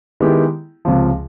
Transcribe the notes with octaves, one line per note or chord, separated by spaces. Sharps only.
D#3 G#3 B3 E4 G4
C#2 C3 F3